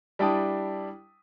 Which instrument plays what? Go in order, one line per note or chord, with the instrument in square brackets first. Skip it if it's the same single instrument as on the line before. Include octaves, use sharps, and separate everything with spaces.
[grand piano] G3 D4 E4 G5 A5 D#6